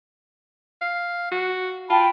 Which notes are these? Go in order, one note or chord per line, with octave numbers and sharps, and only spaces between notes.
F5
F#4
F4 G5 A5 B5